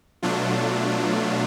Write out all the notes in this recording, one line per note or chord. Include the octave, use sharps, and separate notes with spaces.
B2 F#3 A3 D4 F4